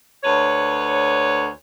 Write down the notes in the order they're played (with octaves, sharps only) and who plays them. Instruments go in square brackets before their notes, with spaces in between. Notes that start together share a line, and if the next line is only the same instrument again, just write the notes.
[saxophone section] D2 B4 C#5